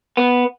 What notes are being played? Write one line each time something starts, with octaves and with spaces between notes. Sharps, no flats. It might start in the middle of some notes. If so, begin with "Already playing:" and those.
B3